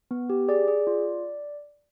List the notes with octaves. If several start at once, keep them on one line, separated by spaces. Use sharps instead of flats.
B3
G4
G#4 D5
G#4
F4